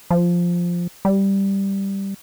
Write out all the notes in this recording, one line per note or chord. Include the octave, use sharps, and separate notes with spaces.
F3
G3